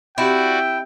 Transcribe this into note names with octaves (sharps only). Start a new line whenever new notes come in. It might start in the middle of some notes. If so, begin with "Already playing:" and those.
C4 E4 F#4 G4 D5 G5